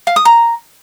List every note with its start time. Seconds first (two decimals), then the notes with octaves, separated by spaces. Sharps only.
0.07 F5
0.16 D#6
0.25 A#5